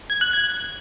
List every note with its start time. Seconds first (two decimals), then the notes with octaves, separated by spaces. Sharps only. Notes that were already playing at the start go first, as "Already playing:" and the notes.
0.10 G#6
0.21 F#6
0.33 G#6